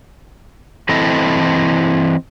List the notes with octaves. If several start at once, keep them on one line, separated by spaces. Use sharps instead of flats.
E3 C4 E4 A4 D#5